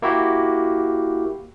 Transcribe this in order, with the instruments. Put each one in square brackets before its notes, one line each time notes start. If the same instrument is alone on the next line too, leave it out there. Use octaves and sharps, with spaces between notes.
[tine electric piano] A#3 E4 F#4 G4